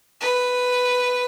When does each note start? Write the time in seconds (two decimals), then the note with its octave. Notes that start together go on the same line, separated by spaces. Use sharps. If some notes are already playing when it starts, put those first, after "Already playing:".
0.21 B4